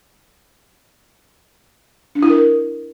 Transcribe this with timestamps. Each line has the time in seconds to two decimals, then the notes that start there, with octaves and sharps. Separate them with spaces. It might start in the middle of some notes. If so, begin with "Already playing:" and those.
2.15 D4
2.23 E4
2.30 A#4